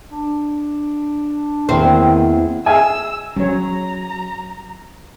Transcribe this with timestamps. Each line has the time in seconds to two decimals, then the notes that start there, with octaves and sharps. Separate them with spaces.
0.12 D4
1.69 E2 D#3 A#3 C4
2.66 G#4 E5 F5 G#5 E6
3.36 F#3 C#4 C#5 A#5